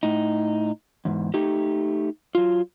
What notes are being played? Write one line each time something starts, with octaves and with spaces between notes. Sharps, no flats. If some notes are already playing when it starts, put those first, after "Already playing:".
A2 D#4
E2 G#2
A3 D#4 G4
F#3 F4